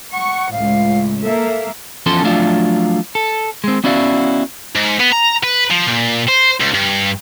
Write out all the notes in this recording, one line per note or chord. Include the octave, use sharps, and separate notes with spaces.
F#5 C#6
C#2 A2 F5
A#3 A4 E5
E2 F3 C#4 A4 A5 C6
F3 F#3 A3 D4 F4
A4
G#3 C4
B3 C#4 E4 F#4 D5 F5
G#2
B3
A#5
B4
F3
A#2
C5
C#2
G2